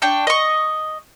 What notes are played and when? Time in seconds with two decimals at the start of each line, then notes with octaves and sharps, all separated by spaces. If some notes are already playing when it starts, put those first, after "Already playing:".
0.02 D4 G5 C#6
0.27 D#5 C#6